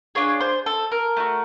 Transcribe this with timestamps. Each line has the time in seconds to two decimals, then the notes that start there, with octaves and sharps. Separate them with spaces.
0.15 D4 F4 G#4 C#5
0.41 C5
0.66 A4
0.92 A#4
1.16 A3 D4 F#4